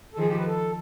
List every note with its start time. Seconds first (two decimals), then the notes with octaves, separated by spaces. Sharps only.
0.13 A4
0.18 D#3 F3 G#4
0.27 G4
0.37 B4
0.46 A4